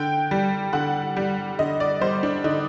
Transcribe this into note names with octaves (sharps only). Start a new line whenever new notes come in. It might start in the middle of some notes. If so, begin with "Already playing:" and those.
Already playing: D3 G5
G3
D3 F#5
G3
D3 D#5
D5
G3 C5
D4
D3 D#4